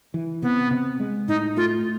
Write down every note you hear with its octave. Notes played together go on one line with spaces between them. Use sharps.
E3
C3 B3
C3
G#3
A2 D#4
A3 F4